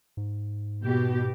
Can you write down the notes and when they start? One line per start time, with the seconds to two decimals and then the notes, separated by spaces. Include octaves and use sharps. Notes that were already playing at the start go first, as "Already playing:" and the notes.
0.17 G#2
0.83 B2 G4